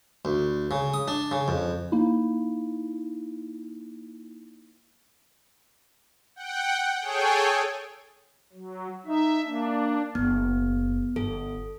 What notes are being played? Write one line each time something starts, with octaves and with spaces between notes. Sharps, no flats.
D2
C#3
D#6
D4
C#3
F2
A#3 D#4 E4
F#5 G5
G#4 A4 C#5 G5 G#5
F#3
D#4 E5
A#3 D4
F#1 B3
G1 A4